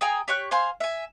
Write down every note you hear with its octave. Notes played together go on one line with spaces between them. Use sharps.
G#4 G5 G#5 A#5
G4 C#5 C#6 F#6
C5 F5 G#5 C6
E5 G#5